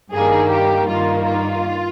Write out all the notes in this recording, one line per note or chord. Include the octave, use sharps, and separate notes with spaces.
G2 D#3 G3 A#3 G#4
G4
G2 D#3 A#3 F4
F4